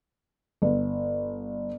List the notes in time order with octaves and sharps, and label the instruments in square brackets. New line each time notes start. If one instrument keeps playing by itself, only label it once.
[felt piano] G1